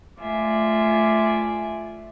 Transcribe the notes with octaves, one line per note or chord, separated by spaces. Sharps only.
A3 F4 D5 E5 G#5